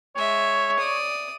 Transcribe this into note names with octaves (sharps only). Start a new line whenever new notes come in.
G#3 C#5 E5
D5 D#6